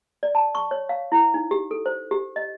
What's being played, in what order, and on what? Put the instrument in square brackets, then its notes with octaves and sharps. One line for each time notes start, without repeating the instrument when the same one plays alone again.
[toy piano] D5
A5
C#6
C#5
F5
E4
D#4
G4
A4
C5
G4
D#5